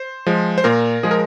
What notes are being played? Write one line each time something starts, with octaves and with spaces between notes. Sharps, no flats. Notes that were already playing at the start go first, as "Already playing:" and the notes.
Already playing: C5
F3 G#3
C5
A#2 A#4
F3 G#3 G#4
A#4